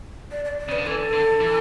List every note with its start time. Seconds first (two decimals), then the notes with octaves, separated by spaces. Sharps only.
0.31 D5
0.45 D5
0.59 D5
0.68 C#3 B4
0.78 D3
0.86 E3 A4
1.13 D3
1.40 E3